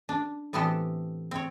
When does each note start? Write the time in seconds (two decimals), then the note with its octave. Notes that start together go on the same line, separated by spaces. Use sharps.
0.09 D4
0.53 A2 E3 B3 C4 G4 A4
1.31 C4 C#5